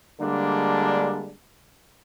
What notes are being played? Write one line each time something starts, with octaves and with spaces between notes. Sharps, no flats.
D3 G3 G#3 A#3 D4